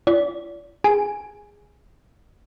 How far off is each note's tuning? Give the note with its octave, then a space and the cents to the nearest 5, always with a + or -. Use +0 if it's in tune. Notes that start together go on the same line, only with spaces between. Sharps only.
F4 -40 D5 -35
G#4 -15 G#5 +0